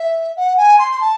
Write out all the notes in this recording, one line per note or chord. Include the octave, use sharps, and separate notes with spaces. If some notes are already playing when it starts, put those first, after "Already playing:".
Already playing: E5
F#5
G#5
C6
C6
A5